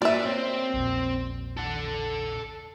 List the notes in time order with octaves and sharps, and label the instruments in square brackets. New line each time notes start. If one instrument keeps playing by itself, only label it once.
[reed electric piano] A#3 F#4 [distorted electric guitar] D4 B4 [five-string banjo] D5 E5
[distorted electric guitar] C4 C5 [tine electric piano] C#5
[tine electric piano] A#1 E2 A#2
[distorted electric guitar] A4 F#5